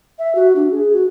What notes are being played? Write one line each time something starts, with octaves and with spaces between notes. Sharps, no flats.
E5
F#4
D4
G#4
F#4